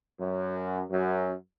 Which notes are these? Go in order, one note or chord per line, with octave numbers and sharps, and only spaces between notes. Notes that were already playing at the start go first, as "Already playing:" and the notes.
F#2
F#2